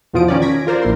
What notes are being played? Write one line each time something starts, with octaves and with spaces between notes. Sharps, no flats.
E2 B2 F3 D#6 D7
D#3 C#4 F4 D5
G#6 A#6 B6 D7
F4 A#4 C5 D5
A#1 A#2 E4 C6